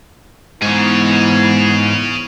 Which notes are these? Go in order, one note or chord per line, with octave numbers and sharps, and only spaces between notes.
G#2 E3 B3 G#4 C#5